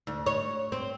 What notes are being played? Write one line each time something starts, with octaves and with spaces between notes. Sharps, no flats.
D2
C#5
C4